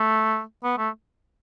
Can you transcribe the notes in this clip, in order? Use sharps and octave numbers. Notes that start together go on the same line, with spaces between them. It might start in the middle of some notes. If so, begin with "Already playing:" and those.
Already playing: A3
B3
A3